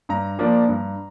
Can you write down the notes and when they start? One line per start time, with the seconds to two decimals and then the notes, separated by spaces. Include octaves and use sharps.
0.09 G2 A#5
0.39 F3 A#3 D4
0.69 G2